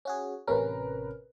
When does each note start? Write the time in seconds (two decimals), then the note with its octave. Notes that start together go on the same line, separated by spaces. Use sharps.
0.05 C#4 F#4 G#4
0.47 A1 C3 C#4 A#4 B4